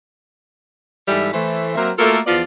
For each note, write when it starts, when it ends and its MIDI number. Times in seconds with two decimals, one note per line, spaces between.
1.07 1.30 44
1.07 1.30 52
1.07 1.30 55
1.07 1.30 67
1.07 1.30 69
1.07 1.30 76
1.32 1.73 52
1.32 1.73 57
1.32 1.73 72
1.75 1.90 54
1.75 1.90 58
1.75 1.90 60
1.75 1.90 70
1.75 1.90 72
1.75 1.90 76
1.98 2.18 57
1.98 2.18 58
1.98 2.18 65
1.98 2.18 66
1.98 2.18 69
1.98 2.18 70
2.26 2.41 40
2.26 2.41 53
2.26 2.41 59
2.26 2.41 65
2.26 2.41 74